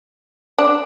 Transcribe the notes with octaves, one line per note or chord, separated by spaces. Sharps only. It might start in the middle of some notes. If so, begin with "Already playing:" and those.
D4